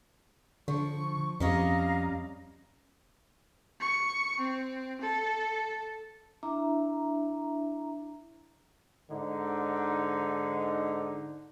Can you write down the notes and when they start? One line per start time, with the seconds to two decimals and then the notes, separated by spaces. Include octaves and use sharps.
0.68 D3 F3 C#6
1.40 F2 G3 C#4 D#5 F5 A#5 D#6
3.80 C#6
4.39 C4
5.01 A4
6.43 D4 E4 E5 A#5
9.10 G#2 D3 D#4